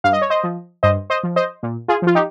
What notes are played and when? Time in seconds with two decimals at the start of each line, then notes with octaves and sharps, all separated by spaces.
0.04 G2 F5
0.13 D#5
0.22 C#5
0.30 C5 D#5
0.44 F3
0.83 G2 C5 D#5
1.10 C5 D#5
1.23 F3
1.36 C5 D#5
1.63 A#2
1.88 F4 G#4
2.02 F3 F4
2.15 D#4 G4